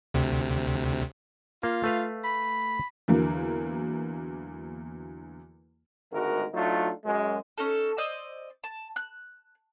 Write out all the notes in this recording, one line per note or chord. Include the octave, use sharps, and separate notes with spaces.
D2 C3
A#3 F4
A3 B4 F5
B5
E2 D3 F#3 A#3
G#1 D2 G#3 F#4 A#4
F#3 A3 D4 D#4 F4
F#2 G#3
C#4 D#4 A4
C5 D5 D#5 E6
A5
F#6